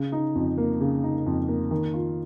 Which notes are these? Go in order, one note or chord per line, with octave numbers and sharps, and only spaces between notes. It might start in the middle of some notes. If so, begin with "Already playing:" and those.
Already playing: C#3
D#4
F2
A#3
C#3
D#4
F2
A#3
D#3
F4